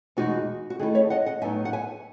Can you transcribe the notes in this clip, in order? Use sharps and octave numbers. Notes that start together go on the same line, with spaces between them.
E2 B2 G#3 D#4 F#4
F#4
D#3 A3 E4 G#4
C#5 E5
D#5 F#5
D#5 F#5
A2 F#3 B3 D#4 E5 G#5
F#5
E5 G#5